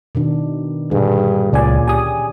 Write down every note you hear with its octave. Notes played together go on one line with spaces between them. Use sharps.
B2 D#3 D4
G2 A#2 D3 G#4
C#2 A#2 C#4 D5 G#5
G4 G#5 D#6